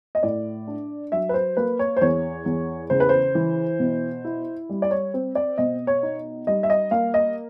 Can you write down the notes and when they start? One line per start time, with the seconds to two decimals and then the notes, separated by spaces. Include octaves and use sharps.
0.15 D#5
0.23 A2 D5
0.68 D4
1.12 F#3 E5
1.29 B4
1.34 C5
1.57 A#3 B4
1.79 C#5
1.97 C5
2.01 E2 C#5
2.46 E2
2.90 C#3 C5
3.00 B4
3.09 C5
3.35 E3
3.80 B2
4.24 E4
4.69 G3
4.82 D5
4.91 C#5
5.14 C4
5.35 D5
5.58 B2 D#5
5.87 C#5
6.03 D#4
6.47 G3 D#5
6.63 E5
6.70 D#5
6.91 A#3 F5
7.14 D#5